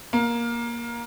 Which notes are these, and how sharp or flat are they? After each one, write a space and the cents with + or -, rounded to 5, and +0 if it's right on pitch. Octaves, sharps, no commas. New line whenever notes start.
A#3 +15